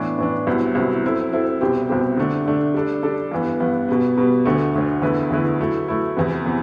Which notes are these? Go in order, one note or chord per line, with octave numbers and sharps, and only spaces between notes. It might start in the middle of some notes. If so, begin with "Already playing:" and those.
Already playing: A2 E3 B3 D4
A2 E3 B3 D4
C2 C3 F#3 B3 E4
C2 C3 F#3 B3 E4
F#3 C4 E4 A4
F#3 C4 E4 A4
C2 B2 G3 C4 G4
C2 B2 G3 C4 G4
D3 A3 D4
D3 A3 D4
G3 D4 A4
G3 D4 A4
G2 E3 B3
G2 E3 B3
B2 G3 B3
B2 G3 B3
D2 D3 A3
D2 D3 A3
E2 D3 A3 E4 B4
E2 D3 A3 E4 B4
F#3 A3 E4
F#3 A3 E4
E2 C3 E3 B3
C3 E3 B3